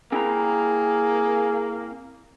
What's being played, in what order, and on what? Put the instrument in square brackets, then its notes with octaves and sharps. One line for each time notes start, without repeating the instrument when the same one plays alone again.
[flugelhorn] A#3 [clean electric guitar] C4 E4 A#5 [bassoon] G#4